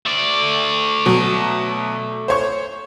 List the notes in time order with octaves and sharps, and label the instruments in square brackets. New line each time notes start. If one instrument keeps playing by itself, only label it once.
[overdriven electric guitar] A3 D5
[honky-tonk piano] B2 F#3
C5 C#5 C#6